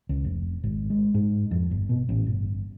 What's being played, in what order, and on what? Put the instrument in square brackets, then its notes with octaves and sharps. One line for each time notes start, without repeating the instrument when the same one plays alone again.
[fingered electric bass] C#2
F1
G#1
G#3
G#2
F2
G1
B2
A1
G1